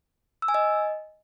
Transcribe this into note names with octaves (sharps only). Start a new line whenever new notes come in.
E6
G#5
D#5